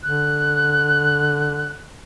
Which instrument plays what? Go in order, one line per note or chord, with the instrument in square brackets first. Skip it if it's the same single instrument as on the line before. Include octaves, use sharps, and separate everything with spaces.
[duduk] D3 [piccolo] F#6